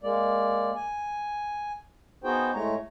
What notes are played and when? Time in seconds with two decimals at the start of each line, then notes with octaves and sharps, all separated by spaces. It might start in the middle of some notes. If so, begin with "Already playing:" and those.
0.03 G#3 A#3 D5
0.75 G#5
2.24 B3 D#4 F#4 G#4 C5 G5
2.53 A2 G#3 A3 C#5 A#5